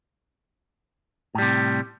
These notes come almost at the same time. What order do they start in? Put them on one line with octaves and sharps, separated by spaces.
A2 G3 C3